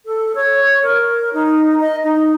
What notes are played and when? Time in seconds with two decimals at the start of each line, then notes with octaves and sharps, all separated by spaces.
0.06 A4
0.35 C#5
0.83 A#4
1.34 D#4
1.80 D#5
2.04 D#4